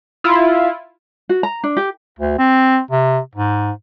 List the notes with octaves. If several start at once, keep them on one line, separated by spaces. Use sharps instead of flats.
E4 F4
F#4
A#5
D4
G4
D2
C4
C3
G#2